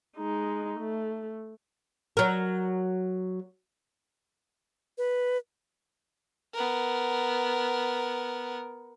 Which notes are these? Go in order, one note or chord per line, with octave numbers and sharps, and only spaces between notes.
G#3 D#4
A3
F#3 A#4
B4
B3 A#4